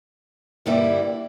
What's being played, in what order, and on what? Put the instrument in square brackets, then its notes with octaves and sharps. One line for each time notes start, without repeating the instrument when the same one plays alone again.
[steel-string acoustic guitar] G2 D3 G3 A#3 E4